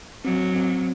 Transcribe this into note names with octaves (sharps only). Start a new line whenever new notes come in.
F#3 C4
C4